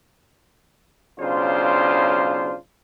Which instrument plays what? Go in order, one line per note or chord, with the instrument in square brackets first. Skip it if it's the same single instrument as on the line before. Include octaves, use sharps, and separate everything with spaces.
[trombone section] B1 C#3 D4 F4 C5